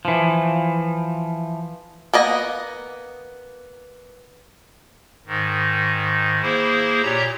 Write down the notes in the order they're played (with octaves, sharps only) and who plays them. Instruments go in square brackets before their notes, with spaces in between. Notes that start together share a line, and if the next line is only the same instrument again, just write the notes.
[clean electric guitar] E3 F3
[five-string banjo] A#3 B3 D#5
[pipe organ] G#2 D#3
A#3 E4 G#4 C5
A#2 G4 C#5 A#5